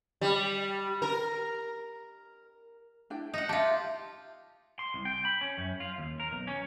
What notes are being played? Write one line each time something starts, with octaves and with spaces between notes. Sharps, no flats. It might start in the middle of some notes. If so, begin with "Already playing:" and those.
G3
A#4
D4 E4 G5
D#4 D#5 F#5
F4 G4 E5 A5
C6
C2
G5
B5
C#4
F#2
F4
D#2
A#4
B1
C#4